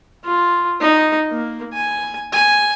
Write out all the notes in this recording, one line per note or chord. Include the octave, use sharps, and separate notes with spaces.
F4
D#4
A#3
G#5
G#5